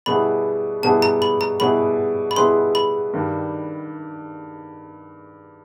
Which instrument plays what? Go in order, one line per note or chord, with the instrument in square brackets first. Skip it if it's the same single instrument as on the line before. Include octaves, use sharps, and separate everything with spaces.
[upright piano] B2 G3 B3 E4 G#4 [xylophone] B5
[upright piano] B2 G3 B3 E4 G#4 [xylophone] A5
[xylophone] A#5
B5
A#5
[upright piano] B2 G3 B3 E4 G#4 [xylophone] B5
[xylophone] B5
[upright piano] B2 G3 B3 E4 G#4 [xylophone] C6
[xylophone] B5
[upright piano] G2 D#3 G3